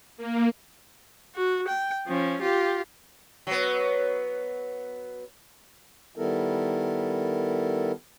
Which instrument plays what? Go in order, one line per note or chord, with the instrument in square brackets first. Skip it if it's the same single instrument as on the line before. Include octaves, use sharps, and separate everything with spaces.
[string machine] A#3
[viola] F#4
G5
F3 C#4
F4 G4
[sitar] F#3 B3
[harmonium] D#3 G3 B3 E4 A4 A#4